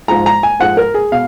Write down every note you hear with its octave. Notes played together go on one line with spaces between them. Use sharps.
G#2 F3 G#3 A#5
A#5
G#5
G#2 F3 G#3 F#5
A#4
G#4
B2 F5